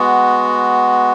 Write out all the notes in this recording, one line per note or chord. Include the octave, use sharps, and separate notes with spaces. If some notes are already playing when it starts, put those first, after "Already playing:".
Already playing: G#3 B3 F#4